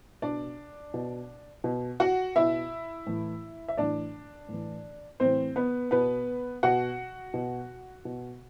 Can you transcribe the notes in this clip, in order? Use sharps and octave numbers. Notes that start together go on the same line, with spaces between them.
B2 D4 D5
B2
B2
F#4 F#5
B2 E4 E5
A2 E3
E5
A2 E3 D4 D5
A2 E3
A2 E3 C4 C5
B3 B4
B2 B3 B4
B2 F#4 F#5
B2
B2